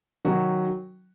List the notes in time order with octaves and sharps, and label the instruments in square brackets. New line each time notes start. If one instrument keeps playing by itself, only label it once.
[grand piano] D#3 F#3 C#4 F#4